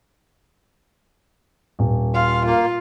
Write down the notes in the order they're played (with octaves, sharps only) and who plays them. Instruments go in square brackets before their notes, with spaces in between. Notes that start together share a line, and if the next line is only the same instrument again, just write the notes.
[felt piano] D#1
[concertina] F4 [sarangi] F5
[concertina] A#3 [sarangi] F4